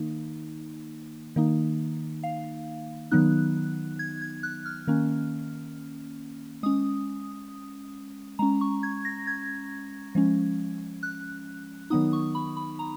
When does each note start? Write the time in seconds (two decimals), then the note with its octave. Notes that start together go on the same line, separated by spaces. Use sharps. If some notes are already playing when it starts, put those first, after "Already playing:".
Already playing: D#3 A#3 D#4
1.36 D#3 A#3 D#4
2.23 F5
3.11 D#3 F#3 B3 D#4 F#6
3.99 G#6
4.22 G#6
4.43 F#6
4.66 F6
4.87 D#3 A#3 C#4
6.63 G#3 C#4 D#6
8.39 G#3 C#4 A#5
8.61 C#6
8.83 G#6
9.05 A#6
9.27 G#6
10.15 F3 G#3 C#4
11.03 F#6
11.90 D#3 F#3 B3 D#4 D#6
12.13 C#6
12.35 B5
12.57 B5
12.79 A#5